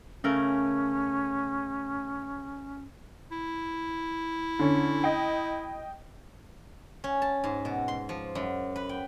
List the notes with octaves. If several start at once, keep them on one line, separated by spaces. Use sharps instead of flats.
C#3 A3 C#4 A#4
E4
D3 C#4
D#5 G5
C#4
A5
G#2
B2
C6
F3
F#2
B4
G5